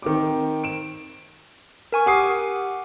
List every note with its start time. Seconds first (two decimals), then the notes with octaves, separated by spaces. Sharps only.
0.02 D#3 C4 D6
0.64 D7 E7
1.92 A#4 G#5 C#6
2.06 G4 F#5 D6 D#6 C7